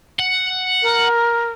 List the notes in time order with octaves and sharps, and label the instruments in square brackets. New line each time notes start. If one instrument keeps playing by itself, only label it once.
[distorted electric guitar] F#5
[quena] A#4